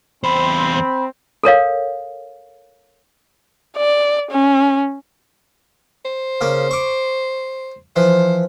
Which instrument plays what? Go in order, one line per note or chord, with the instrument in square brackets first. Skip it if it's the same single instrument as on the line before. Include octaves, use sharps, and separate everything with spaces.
[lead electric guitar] E2 C5 [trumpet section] C4 [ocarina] B5
[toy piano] A4 A#4 C#5 F5
[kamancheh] D5
C#4
[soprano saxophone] C5
[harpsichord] C#3 A#3
C#6 D6
[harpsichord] E3 F3 [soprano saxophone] C5